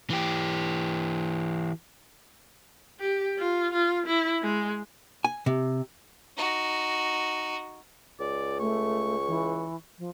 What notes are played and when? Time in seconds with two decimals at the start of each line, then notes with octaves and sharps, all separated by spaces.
0.10 E3 G4
3.00 G4
3.39 F4
3.73 F4
4.07 E4
4.43 G#3
5.25 G#5
5.46 C3
6.37 D#4 F#4
8.20 C#2 D5
8.60 A3 C#6
9.28 E3
9.99 F3